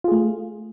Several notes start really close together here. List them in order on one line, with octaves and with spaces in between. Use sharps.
F4 G#4 A3